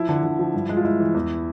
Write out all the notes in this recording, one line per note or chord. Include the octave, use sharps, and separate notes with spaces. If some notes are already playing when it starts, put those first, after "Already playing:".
Already playing: F3 E4
D3
D3
F3
G2
G#3
F4
G#3 E4
E3
E2